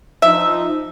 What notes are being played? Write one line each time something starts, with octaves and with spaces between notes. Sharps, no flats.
F3 D#4 E5